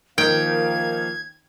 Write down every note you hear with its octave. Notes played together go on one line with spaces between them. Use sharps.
D#3 F3 A#3 F5 G5 G#6